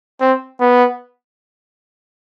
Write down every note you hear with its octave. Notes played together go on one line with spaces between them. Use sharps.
C4
B3